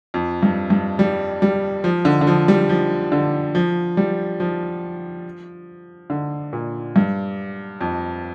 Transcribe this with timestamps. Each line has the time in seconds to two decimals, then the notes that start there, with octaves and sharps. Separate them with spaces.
0.14 F2
0.43 G2
0.70 G2
0.99 G3
1.42 G3
1.84 F3
2.05 D3
2.21 D3
2.27 F3
2.48 G3
2.69 F3
3.12 D3
3.55 F3
3.97 G3
4.40 F3
6.10 D3
6.53 A#2
6.96 G2
7.81 F2